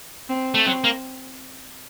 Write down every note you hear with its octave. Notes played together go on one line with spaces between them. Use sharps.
C4
A3
F#3 C4
A#3